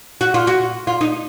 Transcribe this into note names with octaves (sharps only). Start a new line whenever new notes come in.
F#4
F4
F#4
F4
D#4